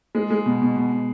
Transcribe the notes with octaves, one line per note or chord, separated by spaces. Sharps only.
G#3
G#3
B2
B2
B2
B2